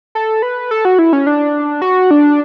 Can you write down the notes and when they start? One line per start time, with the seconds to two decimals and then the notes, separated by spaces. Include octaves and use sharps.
0.15 A4
0.42 B4
0.71 A4
0.85 F#4
0.99 E4
1.13 C#4
1.27 D4
1.82 F#4
2.11 D4